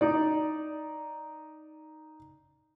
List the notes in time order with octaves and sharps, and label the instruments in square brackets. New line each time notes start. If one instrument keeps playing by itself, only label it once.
[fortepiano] D#4 D5